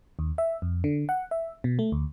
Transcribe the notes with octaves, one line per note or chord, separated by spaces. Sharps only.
D#2
E5
F2
D3
F#5
E5
B2
A3
D2